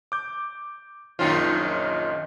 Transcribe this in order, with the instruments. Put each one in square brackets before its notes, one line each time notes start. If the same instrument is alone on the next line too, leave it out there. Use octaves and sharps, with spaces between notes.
[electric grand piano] D6 G6
[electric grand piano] A#1 F#2 F3 [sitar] D#3 C#4 F4